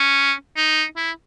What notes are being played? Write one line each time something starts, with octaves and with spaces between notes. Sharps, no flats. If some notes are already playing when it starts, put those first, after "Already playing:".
Already playing: C#4
D#4
E4